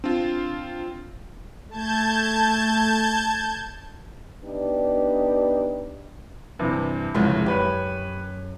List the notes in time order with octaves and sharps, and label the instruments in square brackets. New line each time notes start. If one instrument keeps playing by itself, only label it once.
[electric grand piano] C4 F4 [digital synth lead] D4
[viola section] A3 [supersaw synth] A5 G6 G#6
[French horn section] B3 D4 D#4 G4 B4
[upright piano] G2 C3 E3
[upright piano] G1 C2 F2 [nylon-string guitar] C#3 G#3
[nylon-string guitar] F#2 [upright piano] G4 B4 C#5